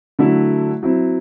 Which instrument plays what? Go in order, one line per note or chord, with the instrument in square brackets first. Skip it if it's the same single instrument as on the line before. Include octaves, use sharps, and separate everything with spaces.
[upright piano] D3 F#3 A3 E4
F#3 C4 E4